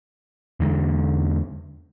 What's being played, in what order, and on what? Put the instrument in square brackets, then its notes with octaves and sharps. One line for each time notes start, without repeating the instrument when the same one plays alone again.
[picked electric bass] E2 D3 G#3